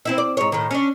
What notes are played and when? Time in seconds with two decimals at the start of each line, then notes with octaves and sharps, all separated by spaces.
0.05 C4 E4 E5
0.18 D5
0.37 G#2 C#5
0.52 A2 D#3
0.71 C#4 D4